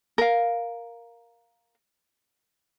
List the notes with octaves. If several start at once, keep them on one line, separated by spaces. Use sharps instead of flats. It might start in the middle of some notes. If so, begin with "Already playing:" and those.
A#4 F5